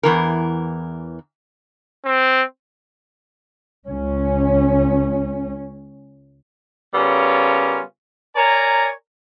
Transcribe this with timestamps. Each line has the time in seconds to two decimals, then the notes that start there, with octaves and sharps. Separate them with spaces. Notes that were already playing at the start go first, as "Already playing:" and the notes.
0.03 E2 E3 A#4
2.05 C4
3.86 C#2 C#4
6.94 C#3 G3 B3 C#4 F4 A#4
8.36 A#4 C#5 D5 G#5 A#5